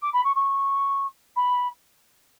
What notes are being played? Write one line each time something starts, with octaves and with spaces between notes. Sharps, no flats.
D6
B5
C#6
C#6
B5